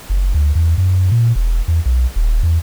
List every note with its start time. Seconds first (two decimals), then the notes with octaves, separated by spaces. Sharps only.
0.10 F#1
0.34 D2
0.55 E2
0.78 F#2
1.11 A#2
1.36 E1
1.68 E2
1.86 B1
2.16 D#1
2.43 E2